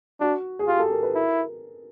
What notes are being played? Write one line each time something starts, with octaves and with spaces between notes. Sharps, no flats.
D4 F#4
G#4
F4 G4
A4
A#4
B4
E4 A#4